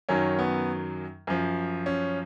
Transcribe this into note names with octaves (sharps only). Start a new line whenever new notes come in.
F#2 D#3 F#3 C#4
B3
F#2 F3
C#4